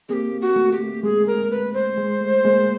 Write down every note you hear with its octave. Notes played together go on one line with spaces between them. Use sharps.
A#3 C4 G4 G#4
F#4
A3
G4
G#3 G#4
A#4
B4
C5
G#3
A3
G#3 A#3